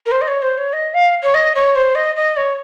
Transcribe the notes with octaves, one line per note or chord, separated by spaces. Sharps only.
A#4
C5
D#5
C#5
C5
C#5
D#5
F5
C#5
D#5
C#5
C5
D#5
D#5
C#5